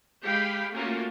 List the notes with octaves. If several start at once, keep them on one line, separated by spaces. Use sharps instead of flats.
G#3 G4 F5 G5 B5
A3 A#3 C#4 F4 F#4